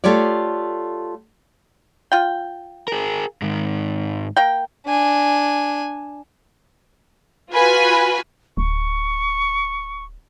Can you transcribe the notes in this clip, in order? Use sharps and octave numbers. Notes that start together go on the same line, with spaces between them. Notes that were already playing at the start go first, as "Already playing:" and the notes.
A3 F4 G4 C#5 D5
F4 G5
G#4 A#4
G#2 D#3
A#3 G5
D4 G#5
F4 F#4 B4 G#5
D1 C#6